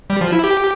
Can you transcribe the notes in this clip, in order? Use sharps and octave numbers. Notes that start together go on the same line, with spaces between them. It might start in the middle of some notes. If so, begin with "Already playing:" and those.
G3
F3
E4
G4